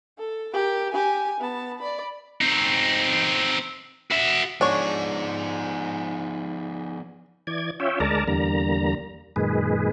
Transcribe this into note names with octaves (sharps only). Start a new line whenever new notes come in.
A4
G4 A#4
G4 G#5
B3 A5
D5 B5
C4 D#4
F#4 E5
F3 B3 D4 D#4 G#4 C#5
E3 D5 G#6
C#4 F4 C#5 E5 G5
D2 G#3 A#4 D5 A5 A#5
E2 D3 G3 A#3 A#5
F#2 A#2 D#3 G#3 G#4 B4